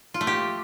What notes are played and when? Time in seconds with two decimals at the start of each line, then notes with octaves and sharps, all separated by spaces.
0.14 F4
0.21 A3
0.27 G4